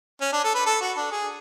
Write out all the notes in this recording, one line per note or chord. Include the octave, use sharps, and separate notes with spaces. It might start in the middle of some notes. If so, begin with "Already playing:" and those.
C#4
D4
A4
B4
A4
F#4
D4
G#4